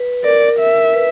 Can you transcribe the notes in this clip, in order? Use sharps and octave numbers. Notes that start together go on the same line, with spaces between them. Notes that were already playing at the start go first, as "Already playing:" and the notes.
Already playing: B4
A#4 D5
E5
B4